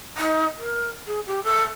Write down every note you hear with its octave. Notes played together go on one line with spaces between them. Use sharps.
D#4
A#4
G#4
G4
A4